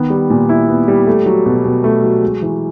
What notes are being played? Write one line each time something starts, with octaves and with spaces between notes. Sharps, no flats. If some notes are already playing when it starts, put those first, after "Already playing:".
Already playing: D#3 B3
G3
A#2
E4
B3
G3
A3
F#3
B2
B2
A3
F#3
G#3
E3